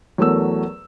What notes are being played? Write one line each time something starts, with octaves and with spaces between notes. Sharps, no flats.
E2 F#3 A3 A#4 E6